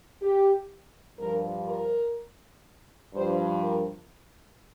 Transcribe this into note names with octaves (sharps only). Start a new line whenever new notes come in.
G4
G2 F3 A#4
A#4
G2 F3 C5
A#4